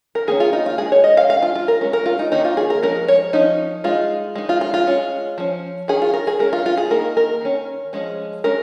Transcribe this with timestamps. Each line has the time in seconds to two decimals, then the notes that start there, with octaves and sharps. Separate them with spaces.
0.15 A#4
0.27 D#3 A#3 C#4 G#4
0.40 F4
0.53 D#4
0.66 F4
0.78 G#3 D#4 G#4
0.92 C#5
1.04 D#5
1.17 F5
1.30 G#3 C#4 F5
1.43 F4
1.55 F4
1.68 A#4
1.81 G#3 C#4
1.93 A#4
2.06 F4
2.19 D#4
2.31 D#3 A#3 C#4 D#4
2.45 F4
2.57 G#4
2.70 A#4
2.83 F3 G#3 C#4 A#4
3.08 C#5
3.33 F3 C#4 D#4
3.84 G#3 D#4 F4
4.36 G#3 D#4
4.49 F4
4.61 F4
4.74 F4
4.87 G#3 C#4
5.38 F3 C#4
5.88 D#3 C#4 G#4
6.02 F4
6.14 A#4
6.27 G#4
6.39 G#3 C#4 A#4
6.53 F4
6.66 F4
6.78 G#4
6.90 D#3 A#3 D#4 A#4
7.17 A#4
7.41 D#3 C#4
7.93 F3 G#3 C#4
8.44 G#3 C#4 A#4